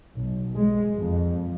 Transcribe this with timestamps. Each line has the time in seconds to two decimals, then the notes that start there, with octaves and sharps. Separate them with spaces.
0.17 B1
0.55 G#3
0.95 F2